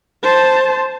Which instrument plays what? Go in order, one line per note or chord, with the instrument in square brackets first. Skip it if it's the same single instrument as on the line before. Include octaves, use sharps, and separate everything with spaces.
[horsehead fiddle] C5 A5